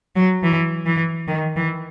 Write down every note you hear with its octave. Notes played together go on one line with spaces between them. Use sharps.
F#3
E3
E3
D#3
E3